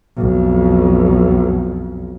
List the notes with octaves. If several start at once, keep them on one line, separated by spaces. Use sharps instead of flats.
B1 F2